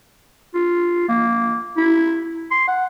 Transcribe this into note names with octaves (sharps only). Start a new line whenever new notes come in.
F4
A#3
E4
C6
F#5